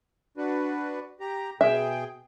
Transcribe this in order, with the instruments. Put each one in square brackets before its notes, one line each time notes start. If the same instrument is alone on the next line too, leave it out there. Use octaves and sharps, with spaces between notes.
[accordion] D4 F#4 B4
G4 A#5
[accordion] B2 G#4 G5 [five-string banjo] E5